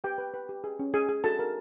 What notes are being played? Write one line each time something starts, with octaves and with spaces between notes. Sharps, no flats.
G4 B4 G5
B4
B4
G4
G#4
C#4
G#4 G#5
G#4
F#4 A4 A5
A#4